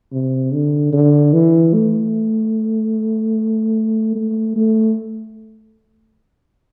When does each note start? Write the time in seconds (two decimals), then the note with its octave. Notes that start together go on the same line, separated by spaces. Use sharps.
0.12 C3
0.52 D3
0.93 D3
1.33 E3
1.74 A3
4.16 A3
4.56 A3